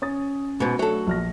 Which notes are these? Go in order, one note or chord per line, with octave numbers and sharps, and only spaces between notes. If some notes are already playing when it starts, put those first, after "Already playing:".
C#4 D#6 A6
G#2 B2
F#3 A3 D4 A4
A#1 F6 A#6